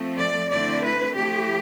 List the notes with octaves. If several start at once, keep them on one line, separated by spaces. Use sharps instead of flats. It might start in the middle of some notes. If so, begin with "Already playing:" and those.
Already playing: F3 A3 C4
D5
D3 A3 C4 E4 D5
B4
F3 A3 E4 G4